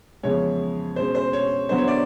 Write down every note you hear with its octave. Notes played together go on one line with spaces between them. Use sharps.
F2 C#3 E3 G#3 B3 C#5
B2 G#3 C#4 C5
C5
C#5
D3 F#3 B3 E4 C5
C#5
D5